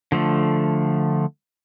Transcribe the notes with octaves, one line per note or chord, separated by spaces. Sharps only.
D3 F3 A3